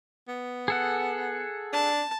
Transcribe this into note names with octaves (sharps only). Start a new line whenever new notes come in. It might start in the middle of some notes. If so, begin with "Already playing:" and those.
B3
G#4 A4 F#5
D4 A5